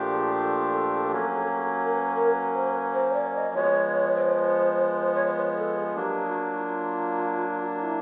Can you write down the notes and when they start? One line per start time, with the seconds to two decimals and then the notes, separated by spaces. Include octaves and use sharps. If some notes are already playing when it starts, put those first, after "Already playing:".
Already playing: A#2 F3 A3 D4 G4
0.11 G#4
0.32 A4
1.12 F#3 A#3 C#4
1.84 A#4
1.93 B4
2.13 A#4
2.33 B4
2.53 C5
2.73 B4
2.93 C5
3.13 D5
3.34 D#5
3.54 F3 G#3 B3 C#5
4.14 C5
5.14 C#5
5.24 C5
5.36 B4
5.56 A4
5.76 G#4
5.87 G#4
5.96 F#3 A#3 D4 G4
6.26 F#4
6.51 F#4
6.56 F4
7.78 E4